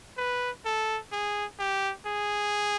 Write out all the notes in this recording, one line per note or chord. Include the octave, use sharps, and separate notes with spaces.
B4
A4
G#4
G4
G#4